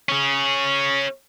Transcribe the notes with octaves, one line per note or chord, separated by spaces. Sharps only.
C#4 G#4